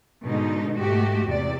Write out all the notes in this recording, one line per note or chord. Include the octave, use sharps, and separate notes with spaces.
G#2 B2 D3 G#3 D#4
G#2 A3 F#4 G4
E2 C3 D5